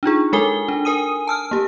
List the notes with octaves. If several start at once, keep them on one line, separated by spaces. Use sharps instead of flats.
D4 D#4 F4 G#4
G#3 A4 A#4 G#5 G7
D4
A#4 G#5 D#6 D#7
A5 E6 F6
A#3 G4